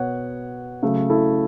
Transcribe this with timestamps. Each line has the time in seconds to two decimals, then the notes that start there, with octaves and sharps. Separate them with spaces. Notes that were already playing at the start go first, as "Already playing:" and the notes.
Already playing: B2 B3 C#5 F#5
0.82 C#3 F#3 A3
1.10 E4 A4